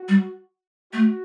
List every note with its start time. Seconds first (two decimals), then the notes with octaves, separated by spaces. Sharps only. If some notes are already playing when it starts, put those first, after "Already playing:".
Already playing: F#4
0.08 G3
0.93 A3 F#4